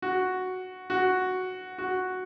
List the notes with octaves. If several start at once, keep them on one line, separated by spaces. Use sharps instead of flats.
F#4
F#4
F#4